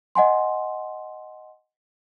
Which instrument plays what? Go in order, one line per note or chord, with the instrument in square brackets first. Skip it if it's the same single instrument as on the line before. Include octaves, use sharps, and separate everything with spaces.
[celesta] D#5 F#5 G#5 C6